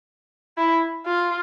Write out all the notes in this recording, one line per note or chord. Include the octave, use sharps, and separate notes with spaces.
E4
F4